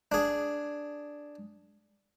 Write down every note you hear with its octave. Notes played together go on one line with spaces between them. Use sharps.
D4 G#4